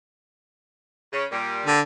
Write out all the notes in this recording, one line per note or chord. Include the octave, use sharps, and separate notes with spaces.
C#3 C#4
A#2 G3
D3